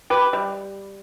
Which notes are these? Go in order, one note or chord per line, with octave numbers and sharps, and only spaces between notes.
G4 B4
G3